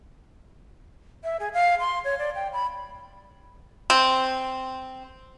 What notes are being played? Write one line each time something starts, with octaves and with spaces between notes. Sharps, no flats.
E5
G#4
F5
C6
C#5
D5
G5
B5
C4